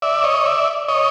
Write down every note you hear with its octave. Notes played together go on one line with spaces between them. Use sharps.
D5 E5
C#5 D#5
D5 E5
C#5 D#5